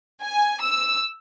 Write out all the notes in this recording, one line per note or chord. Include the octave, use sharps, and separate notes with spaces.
G#5
E6